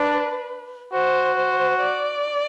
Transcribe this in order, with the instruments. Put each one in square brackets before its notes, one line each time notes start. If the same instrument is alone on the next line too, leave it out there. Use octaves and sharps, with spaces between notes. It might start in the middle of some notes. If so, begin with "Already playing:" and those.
Already playing: [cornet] D4 [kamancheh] B4
[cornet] F#4 [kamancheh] C5
[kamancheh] C5
D5